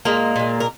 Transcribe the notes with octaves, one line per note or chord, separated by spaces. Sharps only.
A#2 G#3 A#3 A#4
A#2 G#3
A#4